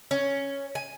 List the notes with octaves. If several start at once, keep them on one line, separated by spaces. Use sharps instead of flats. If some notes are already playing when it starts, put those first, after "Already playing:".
C#4
G#5